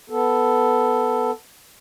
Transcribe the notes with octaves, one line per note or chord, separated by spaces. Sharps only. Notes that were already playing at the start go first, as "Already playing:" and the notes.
B3 A4